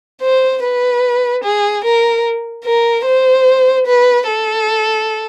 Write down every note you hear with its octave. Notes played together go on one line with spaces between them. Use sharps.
C5
B4
G#4
A#4
A#4
C5
B4
A4